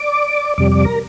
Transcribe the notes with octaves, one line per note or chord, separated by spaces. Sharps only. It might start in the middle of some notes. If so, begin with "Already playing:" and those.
Already playing: D5 D6
F2 C3 G3 D5 D6
D5 D6
A#4 A#5